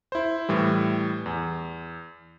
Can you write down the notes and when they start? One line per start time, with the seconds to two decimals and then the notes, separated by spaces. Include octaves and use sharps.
0.12 E4 C5
0.49 A2 E3 G3
1.26 E2